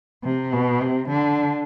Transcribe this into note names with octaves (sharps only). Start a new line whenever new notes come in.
C3
B2
C3
D3